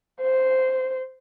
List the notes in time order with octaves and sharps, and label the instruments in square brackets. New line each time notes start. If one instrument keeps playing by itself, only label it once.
[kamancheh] C5